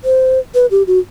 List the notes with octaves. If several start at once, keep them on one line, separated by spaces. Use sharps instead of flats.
C5
B4
G4
F#4